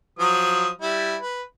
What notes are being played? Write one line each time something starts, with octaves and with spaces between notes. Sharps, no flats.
F3 F#3 D#6
G3 E4
B4